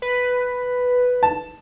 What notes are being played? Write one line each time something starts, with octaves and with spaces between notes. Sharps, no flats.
B4
A5